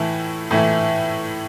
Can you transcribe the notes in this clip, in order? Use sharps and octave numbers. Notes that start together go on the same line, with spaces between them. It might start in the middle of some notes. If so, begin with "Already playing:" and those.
Already playing: A2 E3 A3 E4
A2 E3 A3 E4